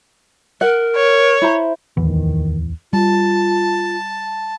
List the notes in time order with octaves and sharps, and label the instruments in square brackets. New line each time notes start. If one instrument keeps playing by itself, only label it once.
[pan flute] A#4 [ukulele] F#5
[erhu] C#5
[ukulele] E4 C5 A#5
[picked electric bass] D1 E2 E3 [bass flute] D#3
[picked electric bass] G3 [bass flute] F4 [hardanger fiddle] A5